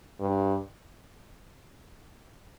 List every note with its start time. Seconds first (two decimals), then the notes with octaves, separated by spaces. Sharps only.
0.20 G2